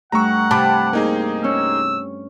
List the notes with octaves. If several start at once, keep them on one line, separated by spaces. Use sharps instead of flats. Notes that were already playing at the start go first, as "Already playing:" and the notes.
G2 A3 F#5 A#5 C#6 E6
C3 A5 B5 D6
A#3 D#4 G#4
C#4 E6